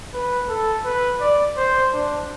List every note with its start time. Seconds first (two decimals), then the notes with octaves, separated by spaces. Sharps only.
0.13 B4
0.48 A4
0.84 B4
1.20 D5
1.57 C5
1.92 D4